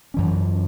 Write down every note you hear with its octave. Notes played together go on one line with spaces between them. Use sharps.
F#2 E3 C#4